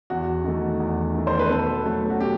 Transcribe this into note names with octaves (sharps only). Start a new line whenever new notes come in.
E2 F#4
D#3 A3
E2
D#3 A3
C5
B4
B2 A4
F#3 A3
F#4
B2 G4